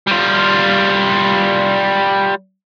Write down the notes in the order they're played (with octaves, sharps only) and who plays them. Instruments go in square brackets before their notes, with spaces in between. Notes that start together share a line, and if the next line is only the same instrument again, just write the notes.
[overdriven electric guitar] G3 F4